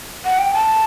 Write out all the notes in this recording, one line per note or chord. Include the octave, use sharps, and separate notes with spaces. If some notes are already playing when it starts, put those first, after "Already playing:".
F#5
G5
A5